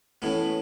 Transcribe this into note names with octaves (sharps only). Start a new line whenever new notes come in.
A2 E3 A3 B3 C#4